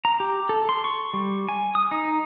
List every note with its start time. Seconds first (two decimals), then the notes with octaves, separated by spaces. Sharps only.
0.05 A#5
0.20 G4
0.49 A4
0.69 C6
0.84 C#6
1.14 G3
1.49 G#5
1.75 D#6
1.91 D#4